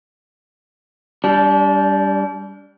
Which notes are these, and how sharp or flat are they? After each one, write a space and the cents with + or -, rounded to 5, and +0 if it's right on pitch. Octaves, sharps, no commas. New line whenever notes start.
G3 +0 D4 -35